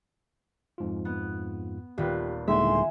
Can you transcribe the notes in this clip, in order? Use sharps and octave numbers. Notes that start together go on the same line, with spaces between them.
F2 G#2 F4
B3
D#1 F4 G4 B4
D#1 D#2 D3 G#3 E4 E5 G#5 C6